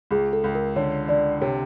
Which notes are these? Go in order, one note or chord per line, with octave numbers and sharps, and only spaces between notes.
C#2 G#4
A4
C#2
A#4
D3 C#5
D3 D5
C3 C#5